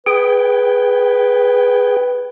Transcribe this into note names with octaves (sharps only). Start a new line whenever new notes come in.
G#4 B4 G5